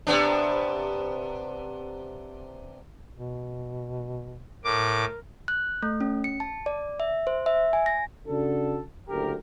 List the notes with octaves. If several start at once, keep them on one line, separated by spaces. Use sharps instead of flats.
C3 B3 D4
B2
A2 A#4 D6
F#6
A3
C#4
C#7
A5
D5
E5
C5
E5
G#5
A#6
C#3 D4 F#4 A4
F#1 D2 D3 G4 A#4